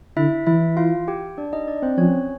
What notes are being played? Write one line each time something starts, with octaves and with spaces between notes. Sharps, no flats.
D3 E4 E5
E3 E4 E5
F4 F5
G4 G5
D4 D5
D#4 D#5
D4 D5
C4 C5
F3 C#4 C#5